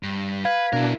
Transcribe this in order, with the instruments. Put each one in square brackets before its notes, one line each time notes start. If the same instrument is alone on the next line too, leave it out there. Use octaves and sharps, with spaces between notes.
[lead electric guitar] G2
[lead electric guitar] B4 [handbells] F5 G#6
[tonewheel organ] B2 D4 [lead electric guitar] E4 A#4